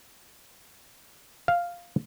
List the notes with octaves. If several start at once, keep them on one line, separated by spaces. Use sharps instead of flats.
F5